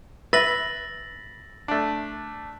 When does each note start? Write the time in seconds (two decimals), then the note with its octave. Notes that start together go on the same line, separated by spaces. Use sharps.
0.33 B4 E5 A6 A#6 F#7
1.68 A3 D4